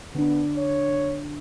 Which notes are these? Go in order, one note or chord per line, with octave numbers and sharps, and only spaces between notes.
D3 B3 D4
C#5